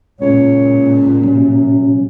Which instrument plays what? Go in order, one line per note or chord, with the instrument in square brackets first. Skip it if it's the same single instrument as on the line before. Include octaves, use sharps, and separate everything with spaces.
[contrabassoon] C#2 [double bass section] A#2 [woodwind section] C#5
[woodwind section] C3 [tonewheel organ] F#3 C#4